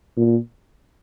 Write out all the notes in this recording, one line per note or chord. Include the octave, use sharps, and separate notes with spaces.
A#2